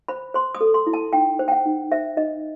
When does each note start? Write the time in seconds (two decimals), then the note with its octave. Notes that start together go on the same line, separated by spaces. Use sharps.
0.08 C5 B5
0.34 C5 C6
0.55 D#6
0.61 A4
0.74 C6
0.87 E4
0.93 A5
1.13 D#4 G5
1.39 C5
1.48 G5
1.52 F#5
1.66 D#4
1.91 C5 E5
2.17 D#4 D#5